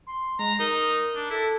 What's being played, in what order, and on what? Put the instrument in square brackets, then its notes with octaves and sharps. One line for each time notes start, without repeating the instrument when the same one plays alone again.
[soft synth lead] C6
[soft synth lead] G#3 [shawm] A#5
[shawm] D#4 [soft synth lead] A#4
[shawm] D4
[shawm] E4 [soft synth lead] A4